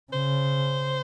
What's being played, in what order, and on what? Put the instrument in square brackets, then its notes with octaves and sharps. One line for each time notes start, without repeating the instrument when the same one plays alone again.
[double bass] C#3 [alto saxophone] C5